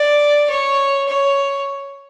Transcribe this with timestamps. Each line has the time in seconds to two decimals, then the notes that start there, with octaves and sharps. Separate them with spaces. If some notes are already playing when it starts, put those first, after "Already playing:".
Already playing: D5
0.50 C#5
1.08 C#5